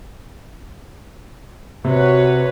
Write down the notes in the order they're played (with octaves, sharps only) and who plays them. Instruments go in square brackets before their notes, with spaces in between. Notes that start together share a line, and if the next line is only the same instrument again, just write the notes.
[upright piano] C3 [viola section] F#4 B4 C#5